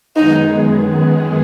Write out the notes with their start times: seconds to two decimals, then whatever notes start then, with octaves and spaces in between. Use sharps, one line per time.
0.16 F#2 D#3 G#3 B3 D#4 G#4